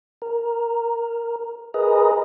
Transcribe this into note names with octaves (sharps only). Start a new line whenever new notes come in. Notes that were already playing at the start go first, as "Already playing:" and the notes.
A#4
G#4 A#4 B4 D#5